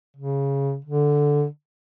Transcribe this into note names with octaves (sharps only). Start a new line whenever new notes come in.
C#3
D3